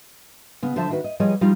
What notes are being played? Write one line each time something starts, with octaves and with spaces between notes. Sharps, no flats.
C#3 B3
D3 F3 C5 E5 A5
D#3 F#4 B4
D#5
F3 G3 G#4 B4 C#5 D#5
F3 G3 D#4 F4